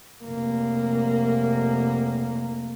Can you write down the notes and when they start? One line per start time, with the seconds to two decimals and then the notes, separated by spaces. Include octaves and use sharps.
0.24 F1 A#3